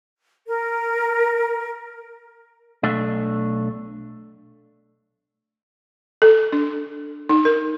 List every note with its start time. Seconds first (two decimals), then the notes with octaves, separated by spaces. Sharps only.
0.47 A#4
2.83 B1 A3 D4
6.22 A4
6.53 D4
7.29 D#4
7.45 A#4